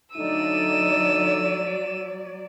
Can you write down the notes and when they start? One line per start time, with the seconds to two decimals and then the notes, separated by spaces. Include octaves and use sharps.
0.16 D3 F#3 A3 D#4 D5 E6 D#7